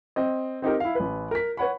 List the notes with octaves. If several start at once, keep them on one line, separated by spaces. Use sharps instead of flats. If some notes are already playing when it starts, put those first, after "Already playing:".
C4 D#5
C4 D#4 G4 A#4
E4 F5
A1 B4
A#4 B6
B4 C#5 F#5 B5